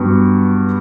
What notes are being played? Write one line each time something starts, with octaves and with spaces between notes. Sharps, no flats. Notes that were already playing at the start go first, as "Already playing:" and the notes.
Already playing: G2 F#3 B3 F#4